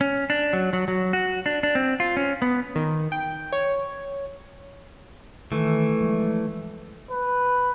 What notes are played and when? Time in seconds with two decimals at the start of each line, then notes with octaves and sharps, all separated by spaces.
0.01 C#4
0.30 D4
0.53 F#3
0.73 F#3
0.88 F#3
1.13 F#4
1.46 D4
1.63 D4
1.75 C4
2.00 F4
2.17 C#4
2.42 B3
2.76 D#3
3.12 G5
3.52 C#5
5.52 D#3 E3 A3
6.01 F3 G#3
7.11 B4